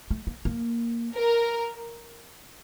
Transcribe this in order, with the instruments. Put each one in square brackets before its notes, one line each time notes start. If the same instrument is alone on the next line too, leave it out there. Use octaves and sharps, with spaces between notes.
[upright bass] A3
A#3
A#3
[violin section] A#4